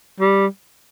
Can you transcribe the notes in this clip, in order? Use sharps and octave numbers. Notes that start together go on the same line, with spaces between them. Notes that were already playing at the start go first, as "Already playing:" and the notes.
G3